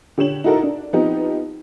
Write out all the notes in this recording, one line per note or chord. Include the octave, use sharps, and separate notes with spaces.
D3 G4 C#5 E7 F#7
D#4 E4 F#4 A4 A#4
D4
F3 B3 C4 D#4 G4